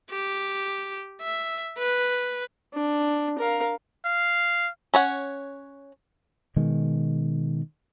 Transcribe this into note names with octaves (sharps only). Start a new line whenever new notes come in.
G4
E5
B4
D4
A#4 F5
F5
C#4 C#5 F#5
B2 D#3 G#3